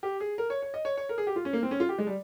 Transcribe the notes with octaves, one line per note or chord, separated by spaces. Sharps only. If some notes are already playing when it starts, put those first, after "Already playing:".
G4
G#4
A#4
C#5
C#5
D#5
C#5
C#5
A#4
G#4
G4
F4
C#4
A#3
C4
C#4
F4
G4
G#3
G3